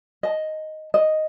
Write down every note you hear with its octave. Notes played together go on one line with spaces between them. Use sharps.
D#5 A5
D#5